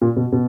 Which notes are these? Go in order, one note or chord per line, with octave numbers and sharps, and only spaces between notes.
A#2
B2
B2